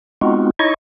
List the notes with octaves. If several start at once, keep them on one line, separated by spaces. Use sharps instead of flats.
G#3 B3 C4 D#4 F4 F#4
D#4 E4 C#5 D#5 C#6